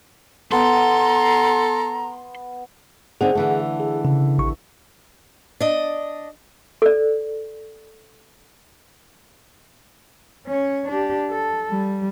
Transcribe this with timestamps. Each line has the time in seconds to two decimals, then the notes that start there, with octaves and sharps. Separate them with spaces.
0.52 B3 A4 A#5 C6
3.21 D3 C4 D#4 G#4 F#5
3.35 D3 E3 A3
3.80 G#4
4.05 C#3
4.38 A1 C#6
5.60 D4 D#5
6.82 A4 D5
10.46 C#4 C#5
10.88 D4 G4
11.30 A4
11.70 G3